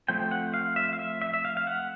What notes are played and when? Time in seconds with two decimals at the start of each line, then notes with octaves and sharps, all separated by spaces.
0.08 F3 A3 C4 G5
0.31 F#5
0.54 F5
0.76 E5
0.93 F5
0.99 E5
1.22 E5
1.34 E5
1.45 F5
1.57 F5
1.67 F#5